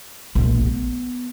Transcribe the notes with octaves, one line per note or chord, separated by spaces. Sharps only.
A#1
B3